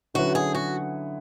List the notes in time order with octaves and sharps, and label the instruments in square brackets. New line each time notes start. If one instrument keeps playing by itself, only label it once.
[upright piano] D3 F#3 C#4 E4 B4 [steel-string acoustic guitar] F#4
[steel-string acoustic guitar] G#4
F#4